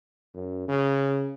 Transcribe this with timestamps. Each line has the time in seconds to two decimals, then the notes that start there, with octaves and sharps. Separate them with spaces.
0.34 F#2
0.68 C#3